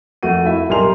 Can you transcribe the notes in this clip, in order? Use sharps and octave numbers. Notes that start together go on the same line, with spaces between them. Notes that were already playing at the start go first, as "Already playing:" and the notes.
F2 A3 F#4 D#7
E4 E5
B1 G3 A#4 G#5 C6 F7